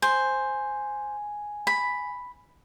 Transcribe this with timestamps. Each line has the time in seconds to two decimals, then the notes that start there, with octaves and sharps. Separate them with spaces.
0.02 C5 G#5
1.67 B5